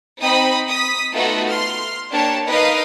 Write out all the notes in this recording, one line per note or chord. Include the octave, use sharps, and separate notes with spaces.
C4 D#4 B5 D#6
D#6 B6
A3 B3 D#4 F4 F#4 A4
C6 F6
A#3 D4 G4 C#5 A5
D#4 A#4 B4 D#5 F5 D#6